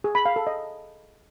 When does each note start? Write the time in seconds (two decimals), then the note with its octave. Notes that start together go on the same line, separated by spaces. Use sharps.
0.04 G#4
0.15 B5
0.26 F5
0.36 A4
0.47 D#5